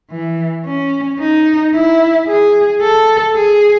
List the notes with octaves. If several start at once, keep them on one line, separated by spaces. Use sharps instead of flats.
E3
C#4
D#4
E4
G#4
A4
G#4